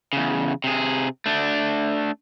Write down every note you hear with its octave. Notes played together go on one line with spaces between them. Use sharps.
E2 C#3
C3 G#4
A3 D4